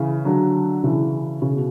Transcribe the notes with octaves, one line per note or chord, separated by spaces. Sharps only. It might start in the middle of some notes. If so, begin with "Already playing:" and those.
Already playing: C#3 E3
D3 F#3
C#3 E3
C#3
B2